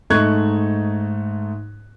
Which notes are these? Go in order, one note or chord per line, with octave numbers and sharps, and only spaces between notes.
G#2 A3 D#4 C#6 F#6 G#6